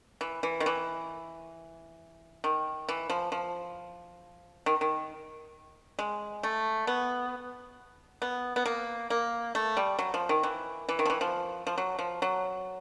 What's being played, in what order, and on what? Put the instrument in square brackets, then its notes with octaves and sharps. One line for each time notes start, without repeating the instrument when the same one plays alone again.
[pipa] E3
E3
D#3
E3
D#3
E3
F3
F3
D#3
D#3
G#3
A3
B3
B3
B3
A#3
A#3
A3
G3
F#3
F3
D#3
E3
E3
D#3
F3
E3
F3
F3
F#3
F3
F#3